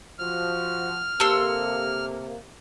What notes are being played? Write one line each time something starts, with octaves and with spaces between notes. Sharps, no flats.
F3 F#4 F6
C3 A#3 G4 A4 C6 E6